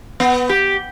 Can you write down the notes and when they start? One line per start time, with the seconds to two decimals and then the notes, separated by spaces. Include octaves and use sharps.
0.20 B3
0.49 G4